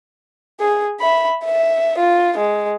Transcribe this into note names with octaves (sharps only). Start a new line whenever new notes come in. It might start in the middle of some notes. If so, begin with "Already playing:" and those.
G#4
E5 B5
E5
F4
G#3